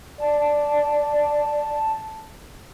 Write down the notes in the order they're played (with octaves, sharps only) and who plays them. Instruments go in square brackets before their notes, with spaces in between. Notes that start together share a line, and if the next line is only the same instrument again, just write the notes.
[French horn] D5 [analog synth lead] A5